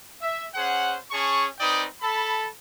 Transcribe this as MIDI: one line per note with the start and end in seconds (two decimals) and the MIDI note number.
0.21 0.45 76
0.55 0.96 61
0.55 0.96 68
0.55 0.96 72
0.55 0.96 78
1.11 1.45 61
1.11 1.45 68
1.11 1.45 81
1.11 1.45 85
1.59 1.85 60
1.59 1.85 63
1.59 1.85 71
1.59 1.85 74
1.59 1.85 79
1.59 1.85 87
2.01 2.49 69
2.01 2.49 81
2.01 2.49 83